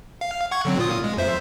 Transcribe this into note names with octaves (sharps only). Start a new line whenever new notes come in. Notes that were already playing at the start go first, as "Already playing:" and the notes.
F5
F#5 C#6 G#6
D3 F#3 C4
A#2 F4 D#6
G#3
F2 C5 E5